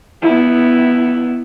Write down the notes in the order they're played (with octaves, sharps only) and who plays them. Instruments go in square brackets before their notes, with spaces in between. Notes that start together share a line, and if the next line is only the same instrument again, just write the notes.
[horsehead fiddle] B3 E4